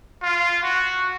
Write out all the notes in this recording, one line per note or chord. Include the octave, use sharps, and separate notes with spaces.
F4
F#4